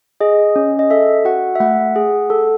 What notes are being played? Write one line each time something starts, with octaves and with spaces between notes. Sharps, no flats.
G#4 D#5
C#4
D#5
A4 E5
F#4 F#5
E5
A3 F#5
G#4
A4